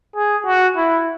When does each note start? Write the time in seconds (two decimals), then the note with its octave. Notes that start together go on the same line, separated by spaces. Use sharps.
0.16 G#4
0.46 F#4
0.77 E4